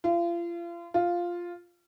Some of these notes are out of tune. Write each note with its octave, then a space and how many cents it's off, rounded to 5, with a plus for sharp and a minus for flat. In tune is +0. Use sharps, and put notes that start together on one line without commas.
F4 -35
F4 +0